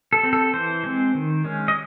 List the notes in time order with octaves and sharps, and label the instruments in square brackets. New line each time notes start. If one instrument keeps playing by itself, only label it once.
[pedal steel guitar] A4
C4
A4
E3 C5
G#3 C4
D#3
G#3 C#4
D#5